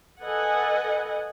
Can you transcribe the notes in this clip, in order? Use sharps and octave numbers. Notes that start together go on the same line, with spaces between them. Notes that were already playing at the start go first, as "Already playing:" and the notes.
A4 B4 D#5 F#5 G#5